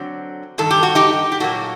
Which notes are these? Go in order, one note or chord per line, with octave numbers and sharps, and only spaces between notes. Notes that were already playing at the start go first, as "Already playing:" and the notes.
Already playing: D3 F#3 C4
G2 D#3 A4
G4
F#4
D#4 G4
G4
A#2 F#3 A#3 F#4 A4